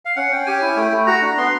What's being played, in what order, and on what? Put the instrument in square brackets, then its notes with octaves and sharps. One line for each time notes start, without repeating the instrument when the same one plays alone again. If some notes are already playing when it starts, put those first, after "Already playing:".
[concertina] F5
C#4 F#5
C#4 G5
G4 G#5
E4
A3 G5
A3
F#4 A#5
D4
B3 C6